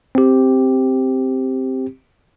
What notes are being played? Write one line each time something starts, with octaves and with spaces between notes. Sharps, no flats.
C4 G4